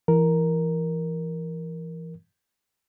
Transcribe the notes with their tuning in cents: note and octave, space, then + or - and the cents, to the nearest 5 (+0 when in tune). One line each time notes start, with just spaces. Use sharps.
E3 +15 A#4 +0